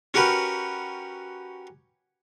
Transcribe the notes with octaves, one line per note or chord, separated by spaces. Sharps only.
C#4 F#4 G4 A#4 B4